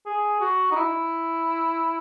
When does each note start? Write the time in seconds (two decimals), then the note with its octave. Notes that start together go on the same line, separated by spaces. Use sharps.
0.06 G#4
0.40 F#4
0.71 D#4
0.76 E4